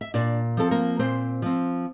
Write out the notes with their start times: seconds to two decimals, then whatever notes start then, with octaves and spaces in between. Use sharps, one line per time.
0.01 E5
0.14 A#2 D4 D5
0.57 F3 C4 A4
0.71 A#3 A#4
0.99 A#2 C4 C5
1.42 F3 C4